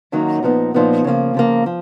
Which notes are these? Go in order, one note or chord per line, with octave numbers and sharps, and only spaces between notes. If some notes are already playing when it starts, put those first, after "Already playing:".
F#2 D#3 F#3 A#3 D#4
A#2 F3 B3 D#4
A#2 F3 B3 D#4
C#3 F3 A#3
C#3 F3 A#3
F3